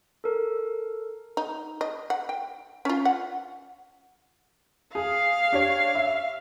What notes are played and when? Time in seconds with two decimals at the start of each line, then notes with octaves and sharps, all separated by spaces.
0.24 A4 A#4
1.37 D#4
1.81 D#5
2.10 F#5
2.29 G5
2.85 C#4 F4
3.05 F#5
4.95 G#4 F5
5.52 D4 G4 C#5
5.95 E5